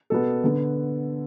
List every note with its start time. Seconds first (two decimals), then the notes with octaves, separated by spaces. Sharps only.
0.10 B2 B3 A4
0.44 D3 B3